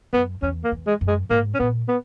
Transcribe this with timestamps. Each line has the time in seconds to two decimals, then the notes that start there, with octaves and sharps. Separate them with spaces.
0.13 F#2 B3
0.42 E2 C#4
0.64 A#3
0.72 E2
0.87 G#3
1.01 F#2
1.08 G#3
1.30 G#2 A#3
1.55 C#4
1.59 A#2 B3
1.88 B3